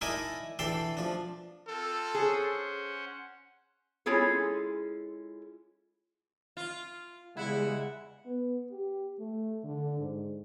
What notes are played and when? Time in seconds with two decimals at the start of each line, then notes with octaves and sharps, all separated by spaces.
0.01 D#4 E4 A#4 D5 G#5 A5
0.59 E3 D4 A4 G5 A5 C6
0.97 F3 D4
1.67 C4 F4 A4
2.15 C#4 G#4 C5 F#5
4.06 G#3 C#4 E4 F4 G#4 A4
6.57 F4
7.37 E2 C#3 G3 G#3 E4 F#5
8.26 B3
8.72 G4
9.19 A3
9.64 D3
9.99 G#2